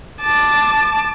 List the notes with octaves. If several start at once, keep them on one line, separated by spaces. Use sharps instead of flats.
A5 D6